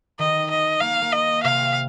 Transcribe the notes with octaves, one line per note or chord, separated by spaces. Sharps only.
D#3 D#5
D#5
A#3 F5
A#3
D#5
C3 F5